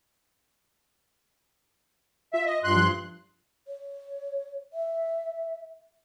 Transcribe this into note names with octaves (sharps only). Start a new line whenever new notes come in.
F4 E5
D#5
G2 C6 F#6
F3
C#5
E5